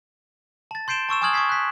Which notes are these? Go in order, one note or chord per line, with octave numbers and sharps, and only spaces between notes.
A5 A6
C6 G6 C7 D7 E7 G7
A5 C#6 E6 E7
G#5 C#6 D#6 F6 G#6 F#7
C#6 D#6 G#6 B6 C7
F#6 B6